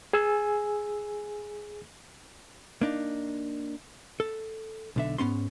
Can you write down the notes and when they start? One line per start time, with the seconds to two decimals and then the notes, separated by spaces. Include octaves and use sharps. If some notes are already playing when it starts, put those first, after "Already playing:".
0.13 G#4 G#5 E6
2.81 A#3 D4 D#4
4.20 A4
4.96 B1 D3 E5
5.18 G#2 B3 C#4 C6